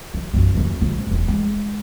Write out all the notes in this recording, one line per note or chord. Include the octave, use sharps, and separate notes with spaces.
F#3
B1 F#2
D#2 F#3
A#1 G#2
E1
G#3